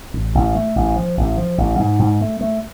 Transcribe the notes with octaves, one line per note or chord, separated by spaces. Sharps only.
A1
A1
A3
A1
F3
A1
F3
A1
G#2
G#2
A3
A3